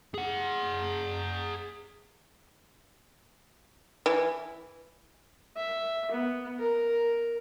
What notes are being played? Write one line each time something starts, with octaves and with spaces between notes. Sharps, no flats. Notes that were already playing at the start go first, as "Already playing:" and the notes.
G#4 F#5
E3
E5
B3
A#4